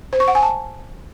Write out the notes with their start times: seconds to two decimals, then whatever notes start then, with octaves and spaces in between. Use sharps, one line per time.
0.13 C5
0.20 C#6
0.28 F#5
0.35 G#5
0.43 A5